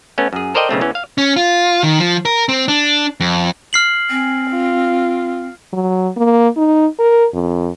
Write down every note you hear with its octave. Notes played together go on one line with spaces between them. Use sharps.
A3 B3 C#4
F#2 G#4
A4 A#4 C5 D5 D#5 G5
B1 C#3 A3 C4
E2 E3 C#4
F5
C#4
F4
D#3
F3
A#4
C4
D4
F2
F6 C7 F#7
C4 G#5
F4
F#3
A#3
D#4
A#4
F2